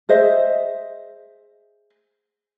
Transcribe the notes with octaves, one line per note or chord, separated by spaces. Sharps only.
G#4 C5 D#5 E5